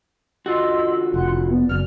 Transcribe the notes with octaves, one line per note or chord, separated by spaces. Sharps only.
D3 F4 F#4 D#5 C6 E6
F1 F#5 C6 F#6
E4
B3 D5
F#1 F#2 F6